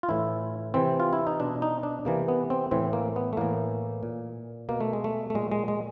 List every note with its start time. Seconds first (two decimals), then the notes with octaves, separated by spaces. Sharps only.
0.03 F4
0.09 A2 E3 E4
0.74 C3 E3 C4
1.00 F4
1.13 E4
1.27 D#4
1.40 B2 D4
1.62 D#4
1.83 D4
2.05 C3 E3 A#3
2.28 B3
2.50 C4
2.71 A2 E3 C4
2.93 A#3
3.16 B3
3.33 A3
3.37 A2 E3 A#3
4.03 A#2
4.69 B2 A#3
4.81 A3
4.93 G#3
5.04 A3
5.30 A3
5.35 A#2 G#3
5.52 G#3
5.68 G#3